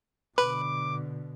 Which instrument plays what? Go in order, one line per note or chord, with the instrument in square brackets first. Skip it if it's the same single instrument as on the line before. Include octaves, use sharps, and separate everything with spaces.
[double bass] B2 D3 [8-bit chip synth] B4 [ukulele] B5 [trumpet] D6